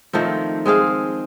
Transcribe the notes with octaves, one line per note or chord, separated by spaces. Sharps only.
D#3 F3 A3 C4
G#3 C4 G#4 F5